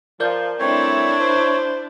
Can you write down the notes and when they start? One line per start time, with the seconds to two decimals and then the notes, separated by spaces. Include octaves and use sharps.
0.20 F3 A#4 D5 G6
0.59 G3 A3 C4 D4 E4 C#5
1.19 C5